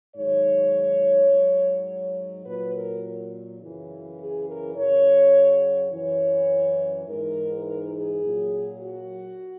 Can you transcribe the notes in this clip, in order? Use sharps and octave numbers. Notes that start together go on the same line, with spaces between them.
G#2 D#3 F#3 C#5
G#2 F#3
A#2 F#3 B4
A#4
F#2 C#3 E3
G#4
A#4
F#2 C#3 F#3 C#5
F#2 E3 C#5
G#2 E3 A#4
A#4
G#4
A#2 F#3
F#4